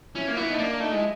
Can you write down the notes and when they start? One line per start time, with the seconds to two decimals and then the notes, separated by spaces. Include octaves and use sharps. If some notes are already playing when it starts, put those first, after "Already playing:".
0.15 C#4 E4
0.28 A#3
0.37 B3 E4
0.49 D#4
0.54 A3
0.58 A#3 D4
0.80 A3 D#4
0.92 G#3 E4